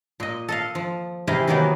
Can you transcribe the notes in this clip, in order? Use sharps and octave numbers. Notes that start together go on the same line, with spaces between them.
A#2 D#5
A4 D#5 F5
F3
C3 E3 E4 G#4 D#5 F5
D#3 E3 F#3 A#3 B3 D#4